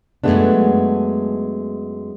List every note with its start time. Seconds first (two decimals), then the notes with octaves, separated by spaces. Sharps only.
0.24 F#2 A#2 G#3 A3 B3 D4